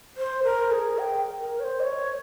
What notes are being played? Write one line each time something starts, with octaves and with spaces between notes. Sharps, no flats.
C5
A#4
G#4
G5
A#4
C#5
C5
D#5
C#5